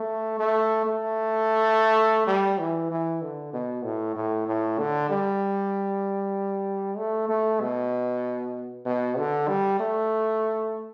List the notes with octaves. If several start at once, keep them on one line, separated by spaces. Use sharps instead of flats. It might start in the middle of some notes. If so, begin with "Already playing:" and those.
Already playing: A3
A3
A3
G3
E3
E3
D3
B2
A2
A2
A2
D3
G3
A3
A3
B2
B2
D3
G3
A3